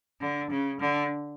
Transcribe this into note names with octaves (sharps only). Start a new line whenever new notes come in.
D3
C#3
D3